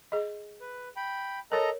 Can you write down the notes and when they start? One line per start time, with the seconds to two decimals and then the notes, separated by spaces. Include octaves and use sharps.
0.12 G#4 D#5
0.61 B4
0.96 G5 B5
1.52 A4 A#4 C#5 D#5 A#5